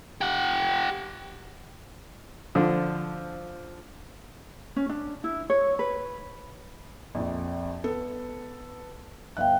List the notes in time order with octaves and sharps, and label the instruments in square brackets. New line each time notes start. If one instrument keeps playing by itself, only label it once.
[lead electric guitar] G4 F#5
[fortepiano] D3 F3
[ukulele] C#4
D4
E4
C#5
B4
[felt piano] A#1 F2
B3 A4
[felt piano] G1 F#6 [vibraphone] E5 F5 G5